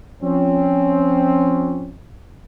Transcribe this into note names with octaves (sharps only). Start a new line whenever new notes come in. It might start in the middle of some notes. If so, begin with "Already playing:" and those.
F3 C4 C#4